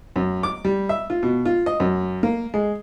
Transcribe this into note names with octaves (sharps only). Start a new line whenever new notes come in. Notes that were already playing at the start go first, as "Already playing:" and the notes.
F#2
D6
G3
E5
F4
B2
F4
D#5
F#2
A#3
G#3